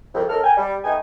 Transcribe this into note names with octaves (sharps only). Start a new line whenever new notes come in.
C2 F2
D#2 A4 A#4 F6
A#4 G5 G#5
G3
A3 B3 D#4 G5 G#5